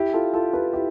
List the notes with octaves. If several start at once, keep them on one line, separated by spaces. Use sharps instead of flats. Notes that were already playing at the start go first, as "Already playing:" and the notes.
Already playing: E4 G4
F4 A4
F4 A4
G4 B4
E4 G4